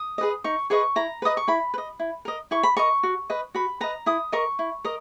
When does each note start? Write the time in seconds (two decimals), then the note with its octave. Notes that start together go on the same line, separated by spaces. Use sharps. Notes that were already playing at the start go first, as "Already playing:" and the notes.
Already playing: D#6
0.18 G#4 B4 D#5
0.44 D#4 C#6
0.70 G#4 B4 D#5 C#6
0.96 E4 A#5
1.22 B4 D#5 D#6
1.37 C#6
1.48 E4 B5
1.74 B4
1.78 D#5
2.00 E4
2.25 A#4 D#5
2.51 E4 C#6
2.63 B5
2.77 A#4 D#5 C#6
3.03 F#4
3.30 B4 D#5
3.55 F#4 B5
3.81 B4 D#5 A#5
4.06 E4 D#6
4.32 A#4 D#5 C#6
4.59 E4
4.85 A#4 D#5